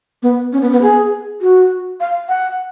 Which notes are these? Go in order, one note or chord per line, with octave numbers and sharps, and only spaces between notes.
B3
C#4
B3
B3
G#4
F#4
F5
F#5